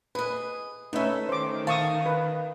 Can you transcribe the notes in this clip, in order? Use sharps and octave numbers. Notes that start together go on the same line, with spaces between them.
G#4 B4 D#5
A3 C#4 D#4 B4 E5
D#3 C5 D6
F5 A5 C#6 D#6
B4